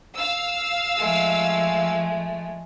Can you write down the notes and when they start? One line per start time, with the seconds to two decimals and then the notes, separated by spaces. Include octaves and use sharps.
0.15 F5 E6
0.97 F3 G#3 A3